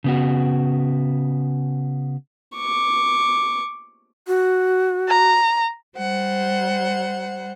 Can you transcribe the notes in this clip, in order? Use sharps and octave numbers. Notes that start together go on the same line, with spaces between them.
C#3 B3 F#4
C#6 D6
F#4
A#5
G3 C5 F#5